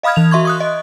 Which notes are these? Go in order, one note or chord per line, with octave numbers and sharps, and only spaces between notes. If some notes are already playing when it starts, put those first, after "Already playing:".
D#5 F5 B5 D#6 F6 G#6
E3 F7
F#4 E5 C6 C#6 G#6
C#6 D#6 F#6
D#5